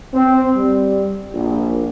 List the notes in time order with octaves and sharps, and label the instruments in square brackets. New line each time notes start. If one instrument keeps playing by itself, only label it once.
[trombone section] C4
G3
A#1